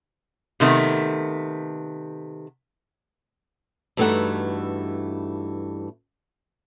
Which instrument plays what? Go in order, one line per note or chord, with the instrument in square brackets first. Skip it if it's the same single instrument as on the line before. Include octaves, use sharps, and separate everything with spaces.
[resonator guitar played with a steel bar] C3 D#3 A3 B3
[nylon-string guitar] G2 E3 A3 D#4 F#4 F#5